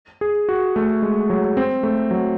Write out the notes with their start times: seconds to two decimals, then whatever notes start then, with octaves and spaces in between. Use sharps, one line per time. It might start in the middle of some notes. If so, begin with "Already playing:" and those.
0.21 G#4
0.49 F#4
0.76 A3
1.02 G#3
1.30 F#3
1.57 C4
1.83 A3
2.11 F#3